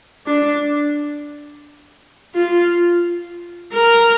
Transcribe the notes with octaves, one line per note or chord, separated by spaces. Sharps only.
D4
F4
A#4